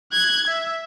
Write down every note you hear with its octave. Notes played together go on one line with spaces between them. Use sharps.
F#6 G#6
E5